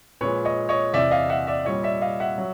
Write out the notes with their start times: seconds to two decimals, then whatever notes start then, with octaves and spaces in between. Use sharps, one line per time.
0.21 A#2 F3 G#3 B4 C#5
0.45 C#5 D#5
0.69 C#5 D#5
0.93 E2 C3 E3 D5 E5
1.11 D#5 F5
1.29 E5 F#5
1.47 D5 E5
1.65 A#2 G3 C#5 D#5
1.83 D5 E5
2.02 D#5 F5
2.20 E5 F#5
2.38 F#3